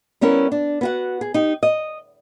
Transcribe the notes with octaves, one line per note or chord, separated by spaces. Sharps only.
G3 B3 C#4 E4 A#4
D4
B3 F#4 F#5
G#4
D#4 G4
D#5